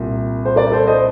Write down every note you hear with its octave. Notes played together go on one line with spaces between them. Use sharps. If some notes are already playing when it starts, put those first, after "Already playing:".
Already playing: C2 A#2
C5
A#4 D5
A4 C5
C5 D#5